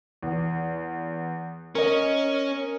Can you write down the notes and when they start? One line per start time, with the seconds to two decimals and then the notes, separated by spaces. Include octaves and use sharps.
0.23 E2
1.75 C#4 A#4 D#5